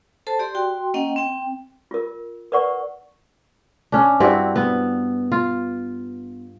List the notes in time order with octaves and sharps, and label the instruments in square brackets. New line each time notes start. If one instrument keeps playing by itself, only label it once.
[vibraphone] A4 C5 A5
G4 D5 C6
F#4 G5 C6
A#3 C#4 D#5 F#5 G5
C4 G5
[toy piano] F4 A#4
A#4 B4 D5 F#5 C#6
[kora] C#4 D4
G2 C4 E4 F#4
B3
F4